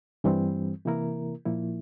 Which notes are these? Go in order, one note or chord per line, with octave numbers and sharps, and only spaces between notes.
G2 E3 G3 C4
C3 E3 A#3 E4 A#4
A#2 F3 A#3 E4